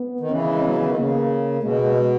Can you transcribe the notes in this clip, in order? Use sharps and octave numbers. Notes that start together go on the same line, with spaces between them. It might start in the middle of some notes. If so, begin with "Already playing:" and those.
Already playing: B3
D#3
C#3 E3 C#4
G#3
F#3 B3
E3
D#3
C#3 A#3
B2 G#3